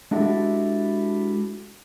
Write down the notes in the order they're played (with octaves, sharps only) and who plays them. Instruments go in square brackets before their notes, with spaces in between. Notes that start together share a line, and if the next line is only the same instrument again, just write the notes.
[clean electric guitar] G#3 D4 E4 F#4 G4 A4